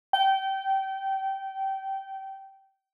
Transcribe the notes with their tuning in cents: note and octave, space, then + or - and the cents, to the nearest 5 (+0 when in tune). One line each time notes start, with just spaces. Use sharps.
G5 -25